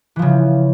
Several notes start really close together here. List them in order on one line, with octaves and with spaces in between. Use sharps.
E3 F3 C#3